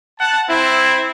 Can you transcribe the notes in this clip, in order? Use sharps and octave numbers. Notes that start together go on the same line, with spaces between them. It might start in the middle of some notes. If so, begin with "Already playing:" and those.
F#5 A5
C4 E4